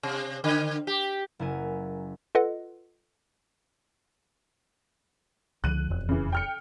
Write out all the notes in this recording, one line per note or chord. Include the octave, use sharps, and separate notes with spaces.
C3
D3
G4
F#1 E4 A#4 G#5
F4 A4 B4 D#5 F#5
C#2 D3 F3 F#6 D#7
E1 F2
C#3 E3
G5 F6 C#7